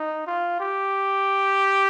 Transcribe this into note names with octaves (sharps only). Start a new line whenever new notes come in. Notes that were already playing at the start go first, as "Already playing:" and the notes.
Already playing: D#4
F4
G4